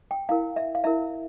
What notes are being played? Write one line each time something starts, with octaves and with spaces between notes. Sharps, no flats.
G5
E4 A#4 F5
E5
F5
E4 A#4 E5